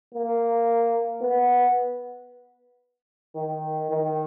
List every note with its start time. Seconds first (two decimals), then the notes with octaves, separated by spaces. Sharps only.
0.14 A#3
1.22 B3
3.35 D#3
3.89 D#3